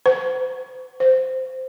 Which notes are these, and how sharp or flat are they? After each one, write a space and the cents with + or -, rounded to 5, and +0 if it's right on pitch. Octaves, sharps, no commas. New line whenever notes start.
C5 -40
C5 -10